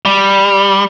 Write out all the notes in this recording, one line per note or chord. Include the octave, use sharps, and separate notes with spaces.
G3